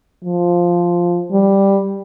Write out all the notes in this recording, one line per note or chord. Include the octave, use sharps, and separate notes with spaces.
F3
G3